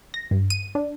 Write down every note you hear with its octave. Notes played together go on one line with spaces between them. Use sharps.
A#6
G2
D#7
D4